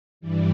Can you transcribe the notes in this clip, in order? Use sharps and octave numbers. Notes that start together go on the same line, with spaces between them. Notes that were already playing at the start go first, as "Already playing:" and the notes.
G2 E3 G3